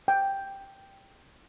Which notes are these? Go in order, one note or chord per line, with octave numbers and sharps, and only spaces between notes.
G5